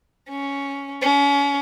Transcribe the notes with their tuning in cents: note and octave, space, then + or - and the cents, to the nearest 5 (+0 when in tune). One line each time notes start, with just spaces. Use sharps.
C#4 +5
C#4 +35